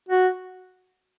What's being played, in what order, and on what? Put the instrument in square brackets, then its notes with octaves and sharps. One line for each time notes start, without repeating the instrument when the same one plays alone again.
[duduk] F#4